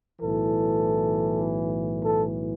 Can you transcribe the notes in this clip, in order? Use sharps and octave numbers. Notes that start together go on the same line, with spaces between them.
B1 A2 E3 A4
A4